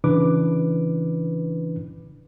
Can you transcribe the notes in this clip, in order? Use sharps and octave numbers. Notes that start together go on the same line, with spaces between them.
C#3 E3 D4 B4 D6